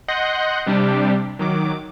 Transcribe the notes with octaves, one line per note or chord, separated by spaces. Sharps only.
D#5 F#5 C6 F#6 G6 A#6
C3 G3 D4 G4
D#3 F#3 D6